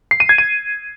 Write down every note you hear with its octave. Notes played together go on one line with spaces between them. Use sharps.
C7
D#7
G#6
D#7